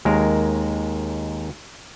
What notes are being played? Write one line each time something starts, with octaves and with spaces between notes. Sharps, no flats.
D#2 G#3 A#4